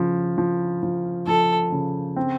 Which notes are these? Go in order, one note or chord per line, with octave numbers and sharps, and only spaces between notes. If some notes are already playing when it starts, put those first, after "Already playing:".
Already playing: C#3 F3
F3
F3
F3 A4
C#3
C4